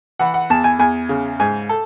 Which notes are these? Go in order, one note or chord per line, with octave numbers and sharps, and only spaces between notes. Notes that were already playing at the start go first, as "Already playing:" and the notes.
E3 F#5
F#5
E2 A5
G#5
E2 G#5
C#3
G#2 G#5
A4